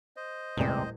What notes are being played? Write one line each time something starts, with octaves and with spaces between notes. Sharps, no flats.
C5 D#5
D#1 A1 C3 G#3 C4 D5